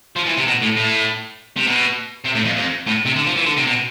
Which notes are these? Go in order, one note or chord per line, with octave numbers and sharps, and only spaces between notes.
F3
E3
C3
B2
A2
A2
C3
B2
C3
A2
F2
F2
A2
C3
D3
F3
E3
D3
C3
B2